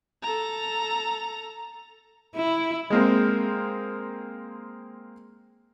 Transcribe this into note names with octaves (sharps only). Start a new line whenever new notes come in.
A4 A#5
E4
G#3 A#3 C4